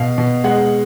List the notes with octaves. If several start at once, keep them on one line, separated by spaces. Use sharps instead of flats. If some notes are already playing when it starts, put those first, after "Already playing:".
Already playing: B2 F5
B2
G#3 F#5